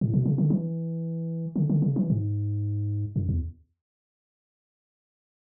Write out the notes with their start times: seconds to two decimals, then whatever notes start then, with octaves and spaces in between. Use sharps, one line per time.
0.01 A2
0.14 B2
0.26 C#3
0.38 D3
0.50 E3
1.56 D3
1.69 D3
1.82 C#3
1.96 E3
2.10 G#2
3.16 F#2
3.29 E2